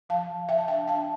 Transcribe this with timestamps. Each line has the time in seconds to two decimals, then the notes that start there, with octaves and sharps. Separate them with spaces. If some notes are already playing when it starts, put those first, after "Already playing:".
0.09 F3 F5 A5
0.29 F3
0.49 F3 E5 G5
0.58 A5
0.68 D4 E5 G5
0.88 D4 F5 A5